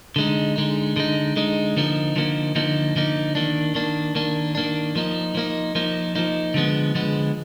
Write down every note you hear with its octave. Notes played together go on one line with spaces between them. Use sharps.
D3 G#3 D#4
D3 G#3 D#4
D3 G#3 D#4
D3 G#3 D#4
D3 F3 A#3 D#4
D3 F3 A#3 D#4
D3 F3 A#3 D#4
D3 F3 A#3 D#4
D#3 A#3 D4
D#3 A#3 D4
D#3 A#3 D4
D#3 A#3 D4
F3 A#3 D#4
F3 A#3 D#4
F3 A#3 D#4
F3 A#3 D#4
D3 F3 G#3 B3
D3 F3 G#3 B3